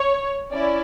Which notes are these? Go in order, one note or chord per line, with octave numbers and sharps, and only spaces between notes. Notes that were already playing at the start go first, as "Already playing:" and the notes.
Already playing: C#5
C#4 E4 D5